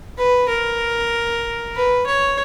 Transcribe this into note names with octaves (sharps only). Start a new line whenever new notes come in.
B4
A#4
B4
C#5